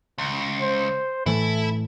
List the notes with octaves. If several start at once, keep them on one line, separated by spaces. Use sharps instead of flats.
C#2
C5
A2 E3 A3 E4 A4